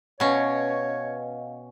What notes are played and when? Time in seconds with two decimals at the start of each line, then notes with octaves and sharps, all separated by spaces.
0.20 B2 C#4 B4 C#5 D#5 F5